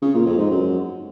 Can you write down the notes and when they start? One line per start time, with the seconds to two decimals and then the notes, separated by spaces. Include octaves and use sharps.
0.02 C#3
0.14 A#2
0.26 F2
0.38 G#2
0.50 F#2